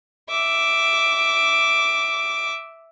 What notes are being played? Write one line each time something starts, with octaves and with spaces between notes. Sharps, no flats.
E5 D6